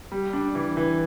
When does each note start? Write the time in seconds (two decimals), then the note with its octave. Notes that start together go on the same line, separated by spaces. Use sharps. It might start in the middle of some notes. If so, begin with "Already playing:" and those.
0.12 G3
0.33 D4
0.55 E3
0.77 E3